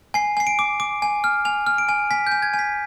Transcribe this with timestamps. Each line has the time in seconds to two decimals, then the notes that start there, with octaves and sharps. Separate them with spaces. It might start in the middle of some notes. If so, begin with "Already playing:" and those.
0.14 G#5 C7
0.37 G#5 C7
0.47 D7
0.59 D6
0.80 D6
1.02 G#5
1.24 F6
1.45 G#5 F7
1.67 F6
1.78 D7
1.89 G#5
2.11 G#5 B6
2.27 G6
2.32 G#5
2.42 G#6
2.54 G#5
2.59 B6